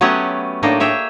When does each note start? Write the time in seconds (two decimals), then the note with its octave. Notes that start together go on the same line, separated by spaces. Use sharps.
0.01 F#3 A3 B3 C#4 G4 F#5
0.63 A2 A#3 D4 D#4
0.80 G#4 C#5 E5 G5